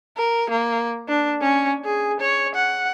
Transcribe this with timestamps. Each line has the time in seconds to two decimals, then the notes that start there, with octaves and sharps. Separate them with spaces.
0.17 A#4
0.50 A#3
1.08 D4
1.42 C#4
1.85 G#4
2.20 C#5
2.55 F#5